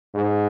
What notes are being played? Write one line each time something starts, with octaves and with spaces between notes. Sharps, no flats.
G#2